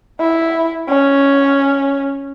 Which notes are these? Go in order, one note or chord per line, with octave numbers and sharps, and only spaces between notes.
E4
C#4